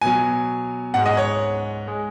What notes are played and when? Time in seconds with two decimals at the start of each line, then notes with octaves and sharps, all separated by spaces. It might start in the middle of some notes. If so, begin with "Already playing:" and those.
0.01 B2 F#3 G#5
0.94 G#2 G#3 F#5
1.06 D#5
1.17 C#5
1.88 G#3